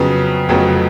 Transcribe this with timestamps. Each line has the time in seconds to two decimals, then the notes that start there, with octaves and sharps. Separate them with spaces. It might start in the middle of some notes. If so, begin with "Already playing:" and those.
Already playing: F2 C#3 F#3 B3
0.48 F1 F2 C#3 F#3 B3